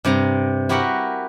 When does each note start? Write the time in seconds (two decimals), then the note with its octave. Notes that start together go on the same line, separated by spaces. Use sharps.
0.05 G2 C3 C5 A#5
0.69 E4 F#4 G4 A#4 B4 F#5